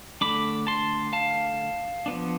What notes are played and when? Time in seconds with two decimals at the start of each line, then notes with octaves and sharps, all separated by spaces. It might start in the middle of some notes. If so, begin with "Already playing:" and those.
0.21 D3 A3 D4 B5 D6
0.67 A5 C6
1.13 F5 A5
2.06 F3 B3 D4